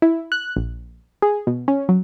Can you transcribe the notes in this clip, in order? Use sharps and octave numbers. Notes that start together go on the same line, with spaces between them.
E4
F#6
A#1
G#4
B2
C#4
F#3